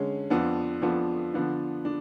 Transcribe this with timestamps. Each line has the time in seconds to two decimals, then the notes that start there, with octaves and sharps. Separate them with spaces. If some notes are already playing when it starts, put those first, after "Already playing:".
Already playing: D3 G#3 C#4
0.30 F2 F3 B3 D4
0.82 F2 F3 B3 D4
1.34 D3 F3 B3 D4
1.85 D4